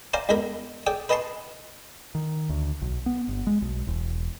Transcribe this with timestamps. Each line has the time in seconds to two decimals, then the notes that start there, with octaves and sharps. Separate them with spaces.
0.14 C5 D5 F5 G#5 A#5
0.29 E2 G2 G#3 A#4 B5
0.87 G#4 D5 G5
1.09 B4 D#5 G#5 A5 C6 C#6
2.15 D#3
2.49 D2
2.82 B1
3.06 B3
3.28 G1
3.47 G#3
3.61 B1
3.87 E1